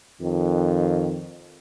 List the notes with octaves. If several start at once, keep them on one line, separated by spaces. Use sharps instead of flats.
F2 D#3